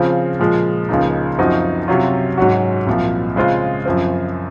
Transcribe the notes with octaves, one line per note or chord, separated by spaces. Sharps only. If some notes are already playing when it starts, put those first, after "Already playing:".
Already playing: C#3 F3 C4 F4
A#2 F3 G#3
C#2 C#3 F3 A#3 D#4
F#2 F3 C4 D#4 F#4
C3 F#3 C#4 F4
G#2 F#3 C#4 F#4
C2 A#2 F3
C#3 G#3 C4 F4
F#2 F3 C4